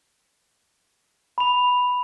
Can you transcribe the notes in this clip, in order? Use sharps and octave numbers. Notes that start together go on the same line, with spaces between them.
B5 F7